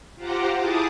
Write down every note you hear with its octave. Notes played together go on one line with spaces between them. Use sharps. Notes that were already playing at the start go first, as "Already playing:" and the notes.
F4 G4 C5 F#5 A#5 D6
E4 G#4 A5 D6 D#6